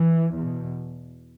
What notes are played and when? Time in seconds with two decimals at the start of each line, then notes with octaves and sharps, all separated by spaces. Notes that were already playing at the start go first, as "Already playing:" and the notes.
Already playing: E3
0.36 E2 B2